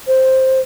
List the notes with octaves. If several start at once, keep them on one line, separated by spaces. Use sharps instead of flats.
C5